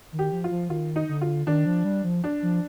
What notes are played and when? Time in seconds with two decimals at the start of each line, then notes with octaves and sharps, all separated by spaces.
0.12 D#3
0.19 G4
0.32 F3
0.44 F4
0.51 F3
0.69 D#3 F4
0.96 D#4
1.09 D3
1.21 F4
1.47 D#3 D4
1.66 F3
1.84 G3
2.04 F3
2.24 D4
2.42 F3